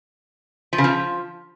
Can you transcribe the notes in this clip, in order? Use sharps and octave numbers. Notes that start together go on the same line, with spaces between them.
F3
C#3
F3